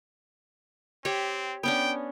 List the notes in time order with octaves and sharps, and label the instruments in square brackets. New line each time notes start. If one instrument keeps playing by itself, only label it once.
[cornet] C4 [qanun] G4 C#5
[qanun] B3 C#4 D4 [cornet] G5